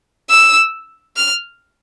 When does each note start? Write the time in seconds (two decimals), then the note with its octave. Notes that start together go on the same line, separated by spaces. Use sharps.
0.30 E6
1.16 F6